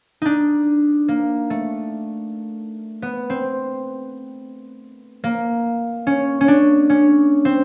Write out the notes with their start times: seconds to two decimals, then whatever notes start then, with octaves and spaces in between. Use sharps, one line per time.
0.22 D4 D#4
1.08 A#3
1.50 A3
3.02 B3
3.30 C4
5.24 A#3
6.07 C#4
6.41 C#4
6.48 D4
6.90 C#4
7.45 C4